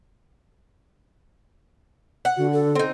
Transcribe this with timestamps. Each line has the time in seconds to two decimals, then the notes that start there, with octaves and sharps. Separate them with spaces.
2.25 F#5
2.37 D3 F#4
2.53 A4
2.75 C4 D#4